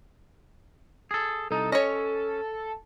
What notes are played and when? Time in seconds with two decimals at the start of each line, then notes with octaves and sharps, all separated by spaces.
1.11 G#4 A4
1.51 C2 D#4 A4
1.72 C#4 C#5 D#5